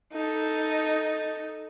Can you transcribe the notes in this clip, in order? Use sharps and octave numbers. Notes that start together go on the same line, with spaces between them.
D#4 A4